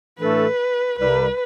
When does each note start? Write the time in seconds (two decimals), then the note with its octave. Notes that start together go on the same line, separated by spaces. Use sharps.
0.18 A2 E3 A3 D4 A4 B4
0.98 C2 C3 G3 B4